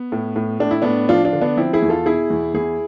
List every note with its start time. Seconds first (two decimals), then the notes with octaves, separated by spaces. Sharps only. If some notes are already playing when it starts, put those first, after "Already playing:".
Already playing: B3
0.12 A2
0.36 A2
0.60 A2 D4
0.71 E4
0.82 A2 B3 D4
1.09 F3 D4 F4
1.25 D4 F4
1.33 D3
1.41 B3 D4
1.57 F3 C4 E4
1.73 E4 G#4
1.82 E2
1.89 F4 A4
2.06 B2 E4 G#4
2.30 E2
2.54 E2 E4 G#4